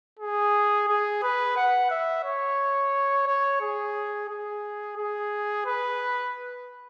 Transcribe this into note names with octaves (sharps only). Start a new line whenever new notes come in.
G#4
G#4
B4
F#5
E5
C#5
C#5
G#4
G#4
G#4
B4